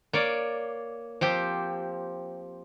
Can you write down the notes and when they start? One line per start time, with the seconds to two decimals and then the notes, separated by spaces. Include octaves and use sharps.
0.13 A#3 C#5 D5
1.21 F3 C4 G4